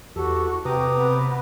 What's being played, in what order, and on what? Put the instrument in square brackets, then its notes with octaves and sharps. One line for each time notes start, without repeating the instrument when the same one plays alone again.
[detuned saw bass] E2 [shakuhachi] F#4 [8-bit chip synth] G4 [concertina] A4
[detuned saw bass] C3 [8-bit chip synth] B4 [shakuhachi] G5 [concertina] A#5 D6 D#6
[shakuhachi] B3